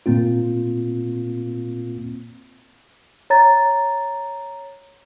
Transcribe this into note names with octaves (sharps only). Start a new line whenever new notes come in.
A#2 A#3 C4 F4
C#5 A#5 A6